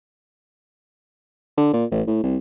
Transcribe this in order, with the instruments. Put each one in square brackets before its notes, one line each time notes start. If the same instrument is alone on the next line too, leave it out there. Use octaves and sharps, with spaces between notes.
[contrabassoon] D3
A#2
A1
A2
C2